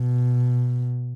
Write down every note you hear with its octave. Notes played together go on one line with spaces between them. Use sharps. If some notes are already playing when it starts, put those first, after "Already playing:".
Already playing: B2